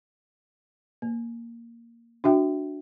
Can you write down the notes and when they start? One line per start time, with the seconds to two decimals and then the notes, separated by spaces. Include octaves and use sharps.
1.02 A#3
2.24 D4 F#4 E5 G5